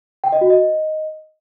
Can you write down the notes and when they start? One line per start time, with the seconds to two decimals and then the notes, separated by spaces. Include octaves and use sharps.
0.24 G5
0.32 D#5
0.41 F#4
0.50 D#5